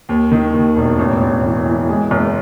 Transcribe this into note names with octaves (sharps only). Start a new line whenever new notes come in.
D#2
D#3
D#2
E1
A1
A1
E3
E3
G#3
F#1